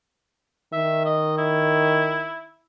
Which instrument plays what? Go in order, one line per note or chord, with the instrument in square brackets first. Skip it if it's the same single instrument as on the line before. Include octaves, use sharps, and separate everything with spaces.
[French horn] D#3 [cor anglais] E5
[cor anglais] D#5
E4